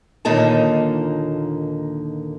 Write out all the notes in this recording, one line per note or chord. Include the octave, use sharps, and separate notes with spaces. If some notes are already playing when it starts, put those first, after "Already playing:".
D#2 A#2 D3 A#3 D#4 A5